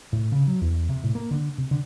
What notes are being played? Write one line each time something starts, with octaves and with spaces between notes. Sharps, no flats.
A2
C#3
F#3
E2
C3
A2
A#3
D3
C3
D3